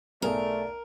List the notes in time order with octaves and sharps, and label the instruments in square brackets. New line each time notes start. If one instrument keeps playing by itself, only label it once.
[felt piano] B1 G#4 [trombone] A3 [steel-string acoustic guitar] A#4 [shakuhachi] D5